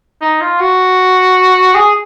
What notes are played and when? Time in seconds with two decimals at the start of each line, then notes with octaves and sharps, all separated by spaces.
0.22 D#4
0.41 F4
0.60 F#4
1.75 G#4